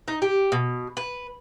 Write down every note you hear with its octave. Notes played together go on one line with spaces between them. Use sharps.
D#4
G4
B2
B4